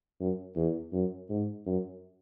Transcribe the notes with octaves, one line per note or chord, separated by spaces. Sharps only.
F#2
E2
F#2
G#2
F#2